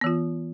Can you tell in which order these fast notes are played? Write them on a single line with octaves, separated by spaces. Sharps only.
B3 E3 F4